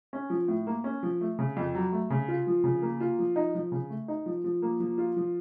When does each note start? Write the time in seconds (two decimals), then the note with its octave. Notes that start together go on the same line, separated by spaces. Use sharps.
0.13 C#4
0.30 F3
0.48 A2
0.67 A#3
0.84 C#4
1.03 F3
1.21 A3
1.39 C#3
1.57 F2
1.75 F#3
1.92 A3
2.10 C#3
2.28 F4
2.47 F3
2.64 C#3
2.82 A#3
3.00 F4
3.19 F3
3.36 D#4
3.55 F3
3.72 C#3
3.90 A3
4.08 D#4
4.26 F3
4.44 F3
4.62 A#3
4.80 F3
4.98 F4
5.17 F3